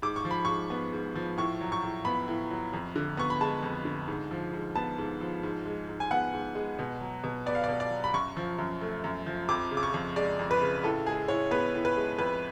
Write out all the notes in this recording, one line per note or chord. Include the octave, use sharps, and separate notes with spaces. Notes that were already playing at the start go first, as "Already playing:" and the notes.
G#2 D6
C#6
F3
B5
G#2 C#6
B3
G#2
F3
A2 C#6
F#3
C#6
A2
B3 B5
A2
F#3
F2
D3
B3 C#6
B5
G#3 A5
F2
D3
G#2
F3
G#2
B3 A5
G#2
F3
G#2
G#3
G#2
G#5
B3 F#5
G#2
G#3
B2
F#3
B2
B3 D5
F5
B2 D5
D5
F#3
B5
F#2 C#6
F3
F#2
A3
F#2
F3
F2 D6
C#3
D6
C#6
F2
G#3 D5
F2
B4
C#3
A2 A4
G#3 G#4
A2 C#5
B3 B4
A2
B4
G#3
F2 B4